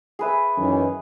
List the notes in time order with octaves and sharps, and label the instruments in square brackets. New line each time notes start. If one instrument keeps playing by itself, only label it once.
[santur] G#4 B4 E5
[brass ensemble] F#2 D#3 E3